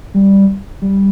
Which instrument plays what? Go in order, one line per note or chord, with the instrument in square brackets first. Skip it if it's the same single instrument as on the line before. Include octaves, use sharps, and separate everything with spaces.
[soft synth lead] G3
G3